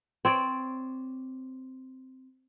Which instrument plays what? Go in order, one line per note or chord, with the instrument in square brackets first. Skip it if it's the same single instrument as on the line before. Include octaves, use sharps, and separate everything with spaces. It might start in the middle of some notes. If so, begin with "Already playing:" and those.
[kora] C4 C#5 D5